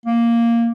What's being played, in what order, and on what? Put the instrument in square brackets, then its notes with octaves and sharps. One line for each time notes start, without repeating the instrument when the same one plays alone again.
[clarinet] A#3